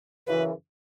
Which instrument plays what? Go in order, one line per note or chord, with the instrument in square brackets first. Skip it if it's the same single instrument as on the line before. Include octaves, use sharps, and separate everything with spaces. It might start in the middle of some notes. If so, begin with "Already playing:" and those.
[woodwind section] F#2 C#3 E3 [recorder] B4